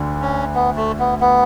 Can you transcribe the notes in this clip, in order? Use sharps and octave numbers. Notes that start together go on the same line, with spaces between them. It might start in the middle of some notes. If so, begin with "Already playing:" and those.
Already playing: D2 D3
C#4
B3
A3
B3
B3